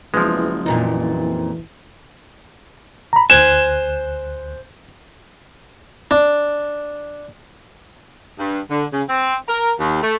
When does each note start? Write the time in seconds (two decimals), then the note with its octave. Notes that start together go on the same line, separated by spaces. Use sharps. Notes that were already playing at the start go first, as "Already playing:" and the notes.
0.14 F#1 E2 E3 F3 G#3
0.66 F2 A#2 E3 D#4
3.13 A#5 B5
3.30 D2 C5 G#5 F#6 E7
6.11 D4
8.39 G2
8.70 D3
8.93 C#3
9.09 C4
9.49 A#4
9.79 D#2
10.02 A3